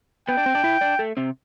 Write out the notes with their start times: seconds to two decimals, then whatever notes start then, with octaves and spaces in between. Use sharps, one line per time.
0.28 B3 B4 G5
0.37 D4 D5
0.46 C4 C5
0.55 D4 D5
0.64 E4 E5
0.81 D4 D5
0.99 A3 A4
1.17 C3 C4